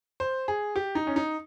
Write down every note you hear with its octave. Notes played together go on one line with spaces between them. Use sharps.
C5
G#4
G4
D#4
C#4
D#4